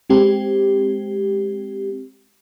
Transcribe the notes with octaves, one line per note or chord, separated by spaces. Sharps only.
G#3 C4 G4